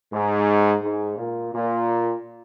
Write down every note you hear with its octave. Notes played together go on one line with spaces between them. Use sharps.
G#2
G#2
A#2
A#2